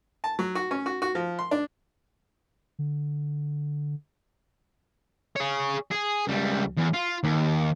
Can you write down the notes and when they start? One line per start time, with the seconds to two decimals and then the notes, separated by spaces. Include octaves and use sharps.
0.24 A5
0.39 F#3
0.55 F#4
0.71 C#4
0.86 F#4
1.02 F#4
1.15 F3
1.39 C6
1.51 D4
2.79 D3
5.36 G#4 C#5
5.91 G#4
6.28 C#2 G3
6.78 E2
6.94 F4
7.23 D#2